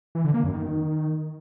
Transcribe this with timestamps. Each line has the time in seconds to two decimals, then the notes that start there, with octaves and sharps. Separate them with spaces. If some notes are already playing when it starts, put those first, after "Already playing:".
0.15 E3
0.25 D3
0.34 A#3
0.44 F#2
0.53 D#3